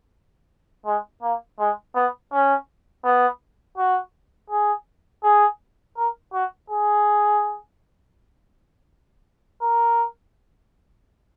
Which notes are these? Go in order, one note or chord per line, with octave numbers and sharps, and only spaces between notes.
G#3
A#3
G#3
B3
C#4
B3
F#4
G#4
G#4
A#4
F#4
G#4
A#4